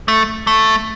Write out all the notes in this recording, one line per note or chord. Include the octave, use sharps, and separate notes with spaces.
A3
A3